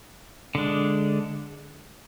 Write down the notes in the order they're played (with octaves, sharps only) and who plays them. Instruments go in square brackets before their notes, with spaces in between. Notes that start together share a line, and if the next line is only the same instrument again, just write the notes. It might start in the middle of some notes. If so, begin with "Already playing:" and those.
[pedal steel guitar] D3 G#3 D4